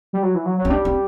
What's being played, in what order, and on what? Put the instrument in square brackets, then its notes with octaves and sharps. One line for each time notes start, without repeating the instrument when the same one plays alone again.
[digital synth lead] G3
F#3
E3
F#3
F#3
[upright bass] C4
[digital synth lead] G3 [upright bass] D4
[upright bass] C4